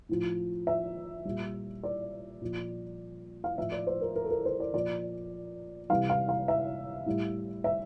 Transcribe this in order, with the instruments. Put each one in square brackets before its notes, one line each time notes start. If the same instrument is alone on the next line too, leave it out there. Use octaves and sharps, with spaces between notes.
[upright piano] A2 F3
E5
A#2 G3
D5
A#2 F3
F5
A2 F3 E5
D5
C5
A#4
A#4
A4
A#4
C5
D5
A#2 F3 D5
C3 E3 G3 F5
F5
F5
E5
A2 G3
E5